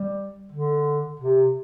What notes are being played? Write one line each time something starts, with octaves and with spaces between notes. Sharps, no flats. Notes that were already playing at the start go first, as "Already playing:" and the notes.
Already playing: G3
D3
C3